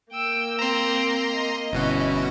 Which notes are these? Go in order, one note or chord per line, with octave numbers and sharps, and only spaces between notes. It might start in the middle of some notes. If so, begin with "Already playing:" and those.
A#3 G5 E6
C4 A#5 C6
D#5
G1 B2 C#4 E4 F#4